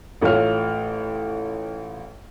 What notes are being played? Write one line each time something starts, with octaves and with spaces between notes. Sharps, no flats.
A1 A3 F4 C#5 F6